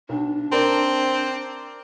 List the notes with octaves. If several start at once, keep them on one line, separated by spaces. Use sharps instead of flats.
B1 D4
C4 A#4 D5 A#5